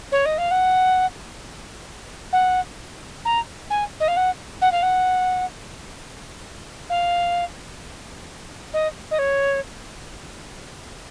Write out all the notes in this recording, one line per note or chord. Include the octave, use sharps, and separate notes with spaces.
C#5
D#5
F5
F#5
F#5
A#5
G#5
D#5
F5
F#5
F#5
F5
F#5
F5
D#5
D#5
C#5